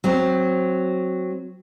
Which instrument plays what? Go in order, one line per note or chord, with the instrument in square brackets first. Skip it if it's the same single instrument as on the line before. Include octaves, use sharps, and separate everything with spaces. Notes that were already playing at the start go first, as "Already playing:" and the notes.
[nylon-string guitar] F#3 C4